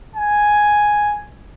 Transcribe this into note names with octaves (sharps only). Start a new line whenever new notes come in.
G#5